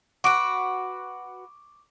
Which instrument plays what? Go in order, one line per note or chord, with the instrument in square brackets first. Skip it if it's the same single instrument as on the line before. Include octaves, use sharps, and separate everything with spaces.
[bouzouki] F#4 B4 [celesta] C#6 D6 D7